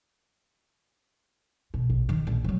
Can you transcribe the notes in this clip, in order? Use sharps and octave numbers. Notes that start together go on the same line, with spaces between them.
B2
A#1
D#3
A#1
F3 F#3